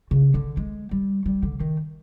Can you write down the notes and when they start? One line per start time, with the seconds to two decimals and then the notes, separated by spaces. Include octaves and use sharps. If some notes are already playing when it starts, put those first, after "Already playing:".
0.11 C#3
0.34 D3
0.57 G#3
0.91 G3
1.26 G3
1.43 D3
1.60 D#3